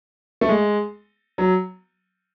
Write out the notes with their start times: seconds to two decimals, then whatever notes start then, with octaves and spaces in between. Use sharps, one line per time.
0.41 A3
0.49 G#3
1.38 F#3